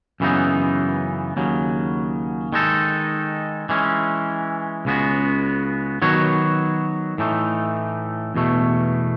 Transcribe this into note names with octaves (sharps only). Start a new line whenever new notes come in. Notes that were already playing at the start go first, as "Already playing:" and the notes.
F#2 C#3 E3 B3 D#4
D#2 C#3 F#3
D#3 G#3 D#4 A4
E3 G#3 C#4
C#2 C#3 G#3 B3 F#4
D#3 F#3 B3 F#4 C#5
A2 E3 A3 D#4
E2 B2 A3